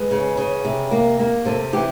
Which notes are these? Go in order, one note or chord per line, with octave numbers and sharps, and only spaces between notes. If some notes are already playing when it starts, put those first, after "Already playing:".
Already playing: G#3 B4
C#3
C#3
C3
A#3
A#3 A#4
C3 A4
E3 G4